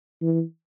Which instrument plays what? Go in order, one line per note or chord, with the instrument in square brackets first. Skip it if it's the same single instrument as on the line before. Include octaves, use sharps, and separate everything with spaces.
[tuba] E3